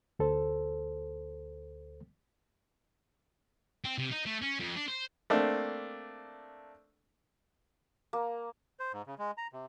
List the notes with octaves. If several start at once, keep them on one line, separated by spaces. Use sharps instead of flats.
D2 A4 C5
C4
C3
D#4
A3
C#4
F2
D4
C5
A3 A#3 C4 D4
A#3
C5
G#2
C#3
G#3
A#5
C3